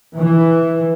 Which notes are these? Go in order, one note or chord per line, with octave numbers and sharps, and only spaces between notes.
E3